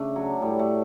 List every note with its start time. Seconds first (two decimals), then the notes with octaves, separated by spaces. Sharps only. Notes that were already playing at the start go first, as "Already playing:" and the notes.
Already playing: C#3 A3 D4
0.16 F#3
0.42 A2 G3
0.59 A3